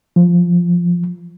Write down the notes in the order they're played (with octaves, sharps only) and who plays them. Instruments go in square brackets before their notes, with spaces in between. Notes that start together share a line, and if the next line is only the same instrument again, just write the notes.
[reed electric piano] F3